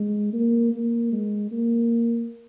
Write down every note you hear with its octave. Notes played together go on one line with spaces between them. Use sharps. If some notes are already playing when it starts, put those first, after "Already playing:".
Already playing: G#3
A#3
A#3
G#3
A#3